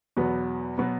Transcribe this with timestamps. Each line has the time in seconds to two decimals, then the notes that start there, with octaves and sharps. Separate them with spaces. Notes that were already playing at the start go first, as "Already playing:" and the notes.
0.17 E2 B2 F#3 B3
0.78 B2 F#3 B3